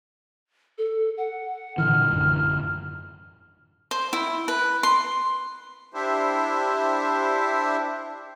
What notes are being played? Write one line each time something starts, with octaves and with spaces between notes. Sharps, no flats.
A4
F#5
A#2 D3 E3 F6
A1 F#2 D3
C5
E4
B4
C6
D4 E4 G4 C5 E5